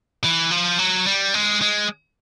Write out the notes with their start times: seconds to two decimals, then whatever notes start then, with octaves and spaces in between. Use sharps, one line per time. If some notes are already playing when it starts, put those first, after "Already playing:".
0.24 E3
0.51 F3
0.79 F#3
1.07 G3
1.34 G#3
1.62 G#3